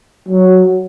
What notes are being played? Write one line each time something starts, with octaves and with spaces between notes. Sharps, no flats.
F#3